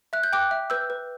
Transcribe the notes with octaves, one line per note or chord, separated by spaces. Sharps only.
E5 F#6
G6
G5 D6 F#6
E5
B4 E6 G6
B4